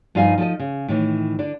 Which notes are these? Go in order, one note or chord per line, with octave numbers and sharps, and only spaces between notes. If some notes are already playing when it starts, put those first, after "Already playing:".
G2 F3 D#4 D#5 F5 G#5
F3 D#4 A4 D#5
C#3
A2 D#3 E3
D3 D4